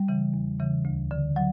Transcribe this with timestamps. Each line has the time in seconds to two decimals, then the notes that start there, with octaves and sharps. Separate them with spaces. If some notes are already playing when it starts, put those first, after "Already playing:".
Already playing: G3
0.08 C#3 E3
0.34 E2
0.60 C#3 E3
0.85 D2
1.11 D3
1.36 F#3